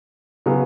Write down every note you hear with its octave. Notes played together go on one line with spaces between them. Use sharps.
C#3 F#3 B3